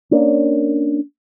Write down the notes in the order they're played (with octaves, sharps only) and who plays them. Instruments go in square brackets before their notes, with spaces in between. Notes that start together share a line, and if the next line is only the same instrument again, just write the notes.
[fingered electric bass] A#3 C#4 D4